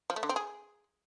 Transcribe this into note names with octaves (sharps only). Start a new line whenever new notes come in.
F3
A3
D3
C4
G#4